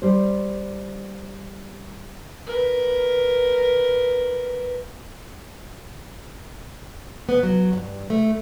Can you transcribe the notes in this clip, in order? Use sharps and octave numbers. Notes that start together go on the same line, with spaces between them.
G3 C5
A#4 B4
B3
F#3
G2
A3